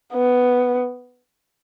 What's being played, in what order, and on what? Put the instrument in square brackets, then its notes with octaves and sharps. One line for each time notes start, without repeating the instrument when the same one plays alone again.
[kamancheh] B3